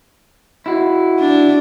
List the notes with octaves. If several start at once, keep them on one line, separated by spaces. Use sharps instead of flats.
E4 F#4
D4